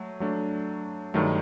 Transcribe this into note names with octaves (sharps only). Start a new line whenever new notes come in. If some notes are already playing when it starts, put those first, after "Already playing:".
Already playing: F#3 A3
F#3 A3 D4
G2 D#3 F#3 A3